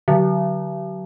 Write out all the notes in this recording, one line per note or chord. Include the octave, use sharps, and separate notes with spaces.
D3 F#3